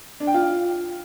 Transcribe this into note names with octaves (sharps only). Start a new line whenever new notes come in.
D4
G5
F4